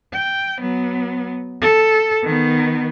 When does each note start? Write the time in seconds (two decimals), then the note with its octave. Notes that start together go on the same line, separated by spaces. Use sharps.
0.13 G5
0.60 F#3 B3
1.62 A4
2.23 D#3 B3